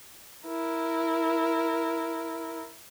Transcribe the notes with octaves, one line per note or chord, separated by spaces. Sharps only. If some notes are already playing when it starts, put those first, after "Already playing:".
E4 A#4